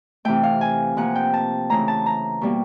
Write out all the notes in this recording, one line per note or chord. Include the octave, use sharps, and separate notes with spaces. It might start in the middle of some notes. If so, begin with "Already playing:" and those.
C3 E3 A3 G5
F5
G#5
C3 F3 A#3 F#5
G5
A5
C#3 E3 A3 A#5
A5
A#5
B2 G3 A#3